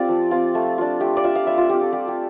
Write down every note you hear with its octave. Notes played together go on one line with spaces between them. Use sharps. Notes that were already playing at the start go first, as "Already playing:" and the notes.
Already playing: A3 C4 F4 G4 D5
F3
C4 F4
A3
D4 F4
A3 G4
D5
D4 F4 E5
F5
G3 E5
F4
C4 F4 G4
A4
G3 G4
G4